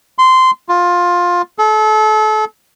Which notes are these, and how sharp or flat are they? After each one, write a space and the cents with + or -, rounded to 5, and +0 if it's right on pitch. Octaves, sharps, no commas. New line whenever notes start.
C6 -15
F4 +15
A4 -35